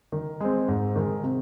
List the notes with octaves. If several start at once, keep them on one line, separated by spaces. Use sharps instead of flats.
D#3
G#3 C4
G#2
D#3 G#3
C3